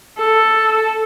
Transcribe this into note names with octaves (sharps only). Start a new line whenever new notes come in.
A4